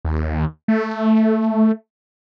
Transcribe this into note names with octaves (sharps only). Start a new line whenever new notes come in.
D#2
A3